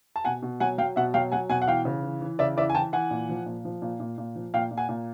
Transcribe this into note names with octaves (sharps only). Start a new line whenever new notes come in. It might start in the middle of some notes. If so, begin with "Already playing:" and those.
A5
B2 F#5 G#5
B2
F#3 F#5 G#5
F#3 F5 G5
B2 E5 F#5
F#3 F5 G5
F#3 F#5 G#5
B2 F#5 G#5
F#5
E3 F5 G5
C#3
E3
E3
C#3 D5 E5
E3 D5 E5
G#5
E3 G5 A5
E3 F#5 G#5
A#2
F3
A#2
F3
A#2
A#2
A#2
F3
A#2 F5 G5
A#2
F#5 G#5
A#2